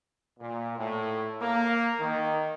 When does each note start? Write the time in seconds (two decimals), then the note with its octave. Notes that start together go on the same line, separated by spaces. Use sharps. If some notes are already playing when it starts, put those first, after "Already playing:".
0.39 A#2
0.78 A2
1.42 A#3
2.00 D#3